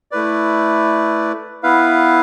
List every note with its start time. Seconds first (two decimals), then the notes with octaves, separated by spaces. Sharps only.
0.11 A3 E4 B4 D5
1.63 B3 E4 B4 F5